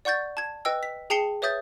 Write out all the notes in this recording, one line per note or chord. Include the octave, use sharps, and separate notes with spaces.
D5 F#5 C#6 G6 A6
A5 G#6
B4 D#5 G5 E6
B6
G#4 G5 A5 C7 C#7 G7
B4 C#5 E5 D#6 G6 A6